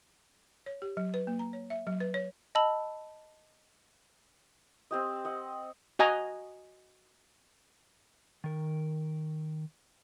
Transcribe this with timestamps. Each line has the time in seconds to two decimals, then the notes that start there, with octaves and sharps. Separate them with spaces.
0.66 C#5
0.82 G4
0.97 F#3
1.14 B4
1.27 A#3
1.39 A#5
1.53 C#5
1.70 E5
1.87 F#3
2.00 B4
2.14 C#5
2.55 D#5 A5 B5 E6 F#7
4.91 C4 G4 D#5
5.25 D#5 F#5
5.99 F#4 D#5 G#5 A#5
8.44 D#3 A#4